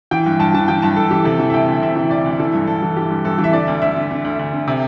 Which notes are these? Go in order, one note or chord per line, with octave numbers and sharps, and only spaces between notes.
E3 G5
G2
G2 A5
E3 A5
E3 G5
G2 A5
G2 A4
E3 G4
C3 A4
E3
E5
D2 G5
D2
C3 E5
E3
D2 D5
D2
E3 A4
G2
G2 A4
E3
E3 G4
G2
G2 A4
E3
E5
D3 D5
D2
D2 E5
D3
D3
D2
D2
D3
C3